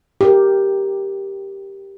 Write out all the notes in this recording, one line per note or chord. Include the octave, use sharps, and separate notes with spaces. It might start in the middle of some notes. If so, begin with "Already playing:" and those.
G4 A#4